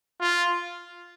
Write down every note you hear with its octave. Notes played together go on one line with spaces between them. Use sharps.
F4